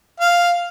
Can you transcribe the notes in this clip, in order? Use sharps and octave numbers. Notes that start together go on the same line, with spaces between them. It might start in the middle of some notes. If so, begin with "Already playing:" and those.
F5